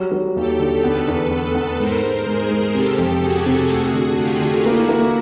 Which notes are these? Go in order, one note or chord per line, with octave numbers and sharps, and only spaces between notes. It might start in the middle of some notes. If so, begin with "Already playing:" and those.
Already playing: F#3 G3
F#3
D#2 G4 A4
D3
B3 A4 B4
E2
B3
B3
G#2 A#4 C5
G#3
G#2 G#4 A#4
G#3
C3 G4 A4
F2
C3 F#4 G#4
C3
A3 F#4 G#4
D3
A3 F4 G4
D3
A#3 E4 F#4
A#3